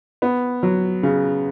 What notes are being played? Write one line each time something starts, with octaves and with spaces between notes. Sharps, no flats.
B3
F#3
C#3